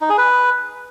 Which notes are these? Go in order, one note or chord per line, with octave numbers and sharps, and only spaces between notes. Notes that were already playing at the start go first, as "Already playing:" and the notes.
D#4
G#4
B4